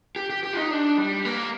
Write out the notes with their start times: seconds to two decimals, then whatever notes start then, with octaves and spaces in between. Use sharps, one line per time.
0.16 G4
0.30 G4
0.43 G4
0.53 F4
0.57 D#4
0.71 D4
0.98 G3
1.25 A#3